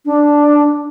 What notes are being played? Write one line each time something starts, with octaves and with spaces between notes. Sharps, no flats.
D4